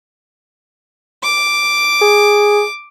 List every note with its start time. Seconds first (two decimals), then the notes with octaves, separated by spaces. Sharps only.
1.23 D6
2.01 G#4